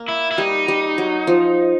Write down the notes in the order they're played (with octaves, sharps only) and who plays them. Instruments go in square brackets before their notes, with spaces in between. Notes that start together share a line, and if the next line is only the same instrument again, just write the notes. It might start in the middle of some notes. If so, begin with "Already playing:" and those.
Already playing: [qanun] A#3
[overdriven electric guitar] E4
E4
[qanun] G3 [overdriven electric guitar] D#4
[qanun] G3
F#3
F3